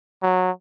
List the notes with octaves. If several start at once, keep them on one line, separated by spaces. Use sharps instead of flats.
F#3